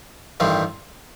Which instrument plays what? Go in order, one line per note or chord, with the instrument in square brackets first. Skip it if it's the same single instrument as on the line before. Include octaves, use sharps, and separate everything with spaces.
[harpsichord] A1 G2 D#3 G3 C4